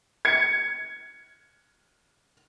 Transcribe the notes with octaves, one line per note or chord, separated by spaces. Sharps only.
G#6 C#7